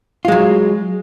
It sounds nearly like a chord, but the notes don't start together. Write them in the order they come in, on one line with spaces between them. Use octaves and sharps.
F4 G#3 F#3